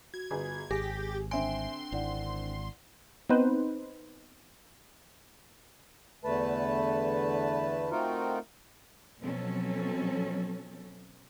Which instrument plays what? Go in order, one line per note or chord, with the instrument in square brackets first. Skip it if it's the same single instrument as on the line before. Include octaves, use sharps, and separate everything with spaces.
[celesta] F#4 [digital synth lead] G#6
[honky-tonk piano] G1 G#4
[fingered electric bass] G#1 [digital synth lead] G4 [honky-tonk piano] G#4 [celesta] A#6
[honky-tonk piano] D3 C4 D7 [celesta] E5 G#5 [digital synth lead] C6
[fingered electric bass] G#1 [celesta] E4 D5 F#5
[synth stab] B3 C4 D#4 B4 C5
[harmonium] E2 D3 A3 B4 A5
A3 C4 D#4 F4 F#4 A#4
[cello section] B2 F3 F#3 C4 C#4 A4